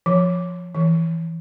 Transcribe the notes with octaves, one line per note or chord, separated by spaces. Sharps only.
F3
E3